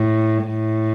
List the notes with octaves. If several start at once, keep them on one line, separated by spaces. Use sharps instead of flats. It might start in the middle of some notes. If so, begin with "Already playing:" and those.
Already playing: A2
A2